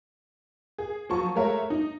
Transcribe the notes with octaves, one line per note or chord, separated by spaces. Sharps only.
G#4
F3 F#3 A5 C#6
G#3 A3 A#4 C#5 E5
D#4